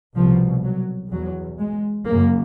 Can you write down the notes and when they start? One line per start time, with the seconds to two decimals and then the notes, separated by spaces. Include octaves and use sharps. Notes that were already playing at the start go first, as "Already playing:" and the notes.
0.16 C2 B2 F3
0.64 F#3
1.11 E2 B2 F#3
1.59 G#3
2.06 F#2 C#3 A#3